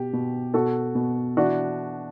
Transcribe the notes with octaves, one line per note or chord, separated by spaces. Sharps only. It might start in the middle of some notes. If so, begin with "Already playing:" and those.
Already playing: B2 G4
B2
B2 F#4 A4
B2
E3 D4 F#4